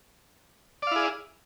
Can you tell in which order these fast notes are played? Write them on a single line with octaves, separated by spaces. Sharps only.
D5 F5 E4 G#4